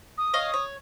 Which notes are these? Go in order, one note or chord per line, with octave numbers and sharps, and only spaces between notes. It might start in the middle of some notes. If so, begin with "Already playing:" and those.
D#6
C#5 D#5 F5
C#5